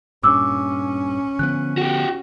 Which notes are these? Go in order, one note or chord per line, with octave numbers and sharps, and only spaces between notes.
G2 A#2 C#4 D6 E6
D3 F3 B3 F#6
F#4 G4